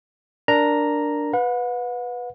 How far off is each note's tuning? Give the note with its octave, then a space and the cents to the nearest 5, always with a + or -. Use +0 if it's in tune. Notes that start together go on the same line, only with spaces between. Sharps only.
D4 +0 A#4 +0 A#5 +0
B4 +0 F#5 -40